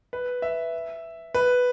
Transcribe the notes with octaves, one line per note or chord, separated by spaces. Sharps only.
B4
E5
B4